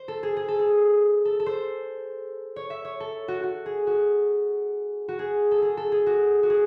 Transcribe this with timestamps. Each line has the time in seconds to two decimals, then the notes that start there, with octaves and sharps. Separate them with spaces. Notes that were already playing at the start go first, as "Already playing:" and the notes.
Already playing: C5
0.08 A4
0.23 G#4
0.37 G#4
0.48 A4
0.59 G#4
1.25 A4
1.40 A4
1.46 C5
2.56 C#5
2.70 E5
2.85 C#5
3.00 A4
3.28 F#4
3.43 F#4
3.66 G#4
3.87 F#4
5.08 F#4
5.19 G#4
5.51 A4
5.62 G#4
5.77 A4
5.92 G#4
6.06 F#4
6.43 F#4
6.50 G#4